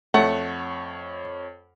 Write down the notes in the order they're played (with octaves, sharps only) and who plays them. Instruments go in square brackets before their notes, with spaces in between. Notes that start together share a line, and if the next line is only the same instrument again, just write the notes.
[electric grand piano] F2 C#5 [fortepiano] A3 [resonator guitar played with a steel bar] F#5